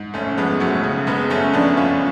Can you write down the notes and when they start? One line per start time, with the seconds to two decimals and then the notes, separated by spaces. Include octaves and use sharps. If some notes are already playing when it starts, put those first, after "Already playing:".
Already playing: G#2
0.14 F1 A3 C#4
0.38 F2 G#3 B3
0.60 F1 F#3 A3
0.83 C#3
1.07 F#1 G#3 B3
1.30 F#1 A3 C#4
1.53 F2 B3 D4
1.77 F#1 C#4 F4